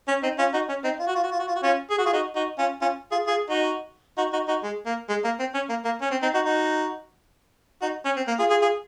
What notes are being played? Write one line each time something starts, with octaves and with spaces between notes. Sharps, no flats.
C#4
C4 D#4
C#4 F4
D#4 F#4
C#4
C4 D#4
F4
F#4
F4
F#4
F4
F#4
F4
F#4
C#4 F4
G#4
F#4
F4 G#4
D#4 F#4
D#4 F#4
C#4 F4
C#4 F4
F4 G#4
F4 G#4
D#4 F#4
D#4 F#4
D#4 F#4
D#4 F#4
G#3
A#3
G#3
A#3
C4
C#4
A#3
A#3
C#4
C4
C4 D#4
D#4 F#4
D#4 F#4
D#4 F#4
C#4
C4
A#3
F4 G#4
F4 G#4
F4 G#4